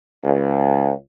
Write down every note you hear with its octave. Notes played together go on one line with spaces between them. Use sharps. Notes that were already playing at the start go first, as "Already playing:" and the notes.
C#2